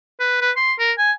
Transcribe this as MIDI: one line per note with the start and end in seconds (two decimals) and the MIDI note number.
0.20 0.40 71
0.41 0.52 71
0.56 0.73 84
0.79 0.92 70
0.98 1.12 80